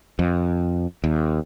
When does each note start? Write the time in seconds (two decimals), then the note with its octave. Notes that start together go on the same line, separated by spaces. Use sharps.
0.19 F2
1.04 D#2